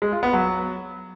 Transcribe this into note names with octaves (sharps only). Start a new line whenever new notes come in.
G#3
F4
B3
F#3